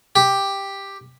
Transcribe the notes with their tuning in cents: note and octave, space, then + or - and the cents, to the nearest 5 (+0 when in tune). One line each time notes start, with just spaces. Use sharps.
G4 +5